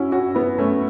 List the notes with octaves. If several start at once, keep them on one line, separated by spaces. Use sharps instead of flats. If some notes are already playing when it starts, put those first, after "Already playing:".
Already playing: C#4 E4 F#4
C#4 F#4
B3 E4
A3 C#4